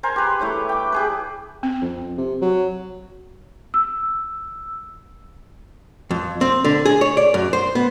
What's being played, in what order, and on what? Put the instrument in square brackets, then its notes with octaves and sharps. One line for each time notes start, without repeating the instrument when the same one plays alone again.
[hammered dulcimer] A#4 C5 G#5
G4 B4
E3 A3 C#5 C#6
G5 D6
G4 G#4 B4
[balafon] C4
[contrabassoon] F2
C3
F#3
[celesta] E6
[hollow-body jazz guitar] F2
C4
D3
G#4
C#5
D5
F#2
C5
B3